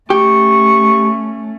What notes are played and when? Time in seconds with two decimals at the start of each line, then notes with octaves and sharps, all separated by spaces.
0.10 A3 C#4 G4 C#6